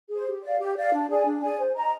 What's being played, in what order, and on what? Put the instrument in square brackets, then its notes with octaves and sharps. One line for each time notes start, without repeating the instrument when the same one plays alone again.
[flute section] G#4 C5
G4
D5 F5
G4
D5 F5
D4
G#4 D5 G#5
D4
G#4 D5 G#5
C5
D#5 A#5